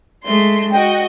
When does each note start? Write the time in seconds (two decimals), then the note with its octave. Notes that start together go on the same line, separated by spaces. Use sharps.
0.23 G#3 A3 C6
0.73 F#4 D#5 G5